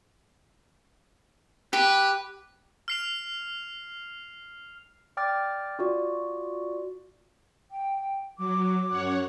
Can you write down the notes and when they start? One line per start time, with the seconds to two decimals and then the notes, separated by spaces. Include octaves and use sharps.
1.73 G4 B4
2.88 F6 C7 F7
5.17 D5 G5 D6 F6 A6
5.79 F4 F#4 D5
7.70 G5
8.38 F#3 D6
8.90 F#2 C#5 F#5